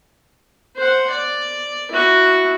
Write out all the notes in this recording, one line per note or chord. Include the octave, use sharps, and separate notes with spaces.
C5 F#5
D5
E4 F#4